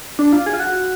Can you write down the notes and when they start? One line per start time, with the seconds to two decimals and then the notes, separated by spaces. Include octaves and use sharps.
0.19 D4
0.32 F4
0.46 G#4
0.53 F4
0.59 F#4